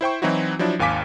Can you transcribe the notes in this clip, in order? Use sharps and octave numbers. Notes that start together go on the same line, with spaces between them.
E4 C5 G5 C#6
E3 F#3 C4 D#4 E4 F#4
F3 F#3 D4 E4
G#1 D#2 F5 G#5 D6 B6